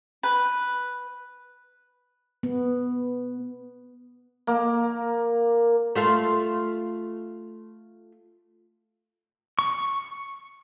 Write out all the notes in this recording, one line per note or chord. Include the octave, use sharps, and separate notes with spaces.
B4
B3
A#3
A3 F4 F5
C#6